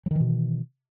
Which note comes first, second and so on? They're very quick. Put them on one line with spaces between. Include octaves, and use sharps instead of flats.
F#3 D#3 E3 B2